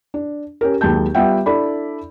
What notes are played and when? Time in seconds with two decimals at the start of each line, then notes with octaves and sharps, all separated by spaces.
0.14 D4
0.61 C#4 G4 A#4
0.81 D#2 F#3 G#3 A5 G6
1.15 G3 B3 F4 E5 F#5 G5
1.46 D4 E4 A4 D5 B5